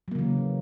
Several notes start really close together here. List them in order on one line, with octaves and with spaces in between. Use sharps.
F#3 A#3 C#3 E3